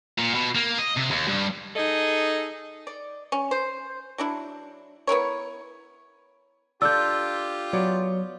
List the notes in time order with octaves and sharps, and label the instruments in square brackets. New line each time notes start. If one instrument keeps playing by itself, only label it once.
[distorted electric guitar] A#2
B2
A#3
D#5
C3
D#2
G2
[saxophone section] D#4 G#4 A4 D#5
[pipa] D5
C#4
C5
F#3 D4 E4
B3 E4 A#4 C#5
[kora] D4 A4 [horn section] F4 G4 [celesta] E6 G6
[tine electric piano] F#3 [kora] B3 C#5 D5